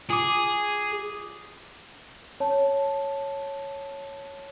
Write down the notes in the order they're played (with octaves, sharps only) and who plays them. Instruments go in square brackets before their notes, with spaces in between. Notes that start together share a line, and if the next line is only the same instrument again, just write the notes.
[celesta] F4 D6 [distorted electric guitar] G#4
[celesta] C#5 A5